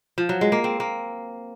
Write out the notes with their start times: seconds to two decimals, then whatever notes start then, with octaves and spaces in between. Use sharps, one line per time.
0.18 F3
0.29 F#3
0.41 G#3
0.52 A#3
0.64 C4
0.80 A#3